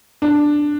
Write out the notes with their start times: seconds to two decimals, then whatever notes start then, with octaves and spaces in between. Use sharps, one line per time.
0.22 D4